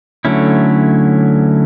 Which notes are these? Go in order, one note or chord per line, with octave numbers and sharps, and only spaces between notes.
D3 F#3 A3 C#4 E4